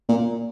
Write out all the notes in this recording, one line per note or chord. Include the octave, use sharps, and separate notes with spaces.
A#2